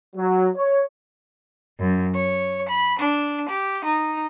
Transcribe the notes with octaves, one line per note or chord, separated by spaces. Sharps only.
F#3
C#5
F#2
C#5
B5
D4
G4
D#4